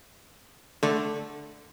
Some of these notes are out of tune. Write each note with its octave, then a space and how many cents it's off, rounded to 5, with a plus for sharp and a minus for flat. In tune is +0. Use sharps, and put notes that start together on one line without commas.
D3 +0 A3 -15